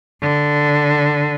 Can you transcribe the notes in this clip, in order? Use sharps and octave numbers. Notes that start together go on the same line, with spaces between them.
D3